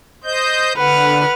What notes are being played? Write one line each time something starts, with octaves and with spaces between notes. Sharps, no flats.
C5 D#5 G6
D3 B4 F#5 F6